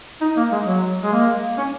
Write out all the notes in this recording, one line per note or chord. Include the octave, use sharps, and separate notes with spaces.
D#4
A#3
G#3
F#3
G#3
A#3
C#4